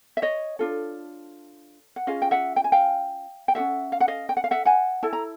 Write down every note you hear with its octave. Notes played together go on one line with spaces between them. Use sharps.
E5
C#5 D#5
D4 F4 A4
F#5
C#4 F4 G#4 D#5 F5
G5
E5 F#5
G5
G#5
F5 G5
G5
C#4 F#4 A4 E5 F#5
F5
F#5
D#5 F5
G5
F#5
F5
E5 F#5
F#5 G#5
E4 A4 A5
A#5